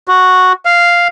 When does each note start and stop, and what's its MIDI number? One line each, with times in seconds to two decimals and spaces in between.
0.08 0.53 66
0.65 1.08 77